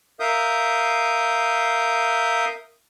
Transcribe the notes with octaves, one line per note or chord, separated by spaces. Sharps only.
A#4 E5 F5 D#6 G6